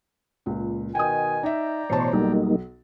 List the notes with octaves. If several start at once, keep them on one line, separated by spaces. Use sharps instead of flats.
C#2 A#2
B2 D#3 G5 G#5 D#6
D#4 D5 E5 G5 A#5
A1 B2 C5 C#5 A5
B1 G3 A#3 D#4